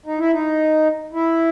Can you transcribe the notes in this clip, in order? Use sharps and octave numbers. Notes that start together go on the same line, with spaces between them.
D#4
E4
D#4
E4